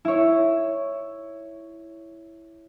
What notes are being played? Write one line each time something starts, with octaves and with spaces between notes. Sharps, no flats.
E4 C#5